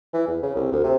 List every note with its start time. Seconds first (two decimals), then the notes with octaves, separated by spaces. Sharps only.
0.13 E3
0.27 E2
0.43 C#3
0.56 C2
0.72 D2
0.84 C3